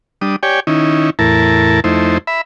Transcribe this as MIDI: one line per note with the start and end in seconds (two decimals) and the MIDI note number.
0.21 0.36 55
0.21 0.36 62
0.21 0.36 87
0.43 0.60 67
0.43 0.60 73
0.43 0.60 74
0.43 0.60 79
0.43 0.60 80
0.67 1.10 51
0.67 1.10 61
0.67 1.10 63
0.67 1.10 64
1.19 1.80 40
1.19 1.80 45
1.19 1.80 64
1.19 1.80 70
1.19 1.80 81
1.84 2.18 41
1.84 2.18 57
1.84 2.18 63
1.84 2.18 64
1.84 2.18 72
2.27 2.41 76
2.27 2.41 83